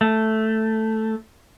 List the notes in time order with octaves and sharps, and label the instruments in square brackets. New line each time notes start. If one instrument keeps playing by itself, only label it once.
[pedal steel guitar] A3